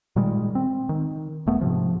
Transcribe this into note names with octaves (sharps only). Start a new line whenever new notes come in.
A#2 D#3 G3 G#3
C4
D#3
D#1 A3 B3
G#2 C3 F3